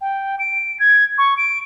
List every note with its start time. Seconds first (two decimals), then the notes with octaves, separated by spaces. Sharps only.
0.01 G5
0.39 D7
0.80 G#6
1.18 C#6
1.38 D7